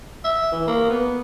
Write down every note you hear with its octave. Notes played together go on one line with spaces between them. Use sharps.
E5
E3
A#3
B3